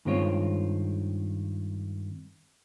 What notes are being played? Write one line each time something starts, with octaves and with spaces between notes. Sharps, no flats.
G2 D#3 G#3 C4 F4 C#5